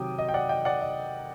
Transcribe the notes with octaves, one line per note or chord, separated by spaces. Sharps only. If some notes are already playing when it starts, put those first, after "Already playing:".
Already playing: C3 D#3 F#3 G5 D6 D#6
D#5
G5
D5 F#5
D#5 G5
D5 F#5
D#5